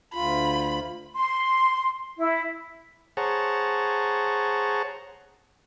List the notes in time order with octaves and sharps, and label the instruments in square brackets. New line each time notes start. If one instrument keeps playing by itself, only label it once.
[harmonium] D2 F4 [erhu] B5
[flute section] C6
E4
[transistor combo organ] G#4 C5 C#5 F#5 A5 A#5